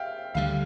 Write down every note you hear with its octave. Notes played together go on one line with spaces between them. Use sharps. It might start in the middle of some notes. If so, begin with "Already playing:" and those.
Already playing: E5 F5 G5
D2 D3 G3 F5